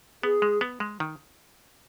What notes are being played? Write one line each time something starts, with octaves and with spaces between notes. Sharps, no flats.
B3 G#4
G#3
B3
G#3
D#3